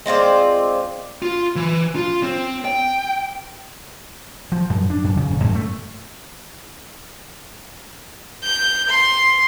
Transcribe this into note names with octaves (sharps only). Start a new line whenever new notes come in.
G#3 C4 F4 D5
F4
E3
F4
C4
G5
F3
F#2
D4
F#2
C#3
D#1
F#2
A3
G6
C6